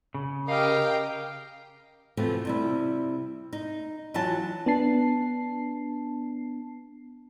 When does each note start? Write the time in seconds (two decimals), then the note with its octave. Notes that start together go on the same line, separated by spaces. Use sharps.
0.14 C#3
0.48 G4 A#4 D#5 F5 G5
2.17 B2 E3 F3 A3 C4
2.45 C3 G3 E4
3.53 D#4
4.14 E3 F#3 F4 F#5 A5
4.66 B3 D4 A5 C7